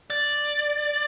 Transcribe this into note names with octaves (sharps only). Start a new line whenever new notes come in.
D5